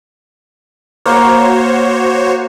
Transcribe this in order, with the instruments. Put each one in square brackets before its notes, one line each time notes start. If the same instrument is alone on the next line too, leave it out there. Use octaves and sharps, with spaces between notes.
[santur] A#3 [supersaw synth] F#4 C5 C#5